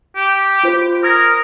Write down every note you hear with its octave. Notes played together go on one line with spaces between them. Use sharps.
G4
F4 C5
A#4 D#6 G#6 A#6